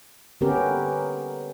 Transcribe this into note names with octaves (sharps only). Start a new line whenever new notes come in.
D3 B3 C#4 G4 A#4